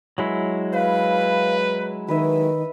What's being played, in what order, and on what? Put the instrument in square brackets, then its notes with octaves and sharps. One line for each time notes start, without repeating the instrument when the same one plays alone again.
[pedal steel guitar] F#3 G#3 E4 [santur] C#5
[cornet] B4 [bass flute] F5
[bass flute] D#3 [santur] B4 D#5 E5